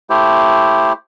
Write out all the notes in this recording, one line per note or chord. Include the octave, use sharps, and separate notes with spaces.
A3 E4 G4 C5